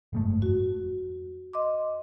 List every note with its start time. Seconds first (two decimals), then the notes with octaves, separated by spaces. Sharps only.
0.13 F#1 G#2 A3
0.42 F2 F#4
1.53 D#5 C6 D6